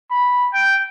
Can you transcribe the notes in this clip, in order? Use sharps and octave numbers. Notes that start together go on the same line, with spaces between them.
B5
G5